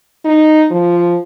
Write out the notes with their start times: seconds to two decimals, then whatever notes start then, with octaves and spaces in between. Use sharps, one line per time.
0.25 D#4
0.71 F3